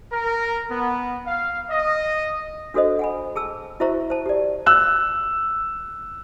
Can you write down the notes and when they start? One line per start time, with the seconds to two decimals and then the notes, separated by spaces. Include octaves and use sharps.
0.11 A#4
0.71 B3
1.26 F5
1.69 D#5
2.74 D4 F#4 A4 C5 D#5
2.99 F#5 G#5 B5
3.36 G#4 A5 E6
3.80 E4 F#4 C5 E5 A#5 C#6
4.10 C5 A5
4.26 G4 D5
4.66 E6 F#6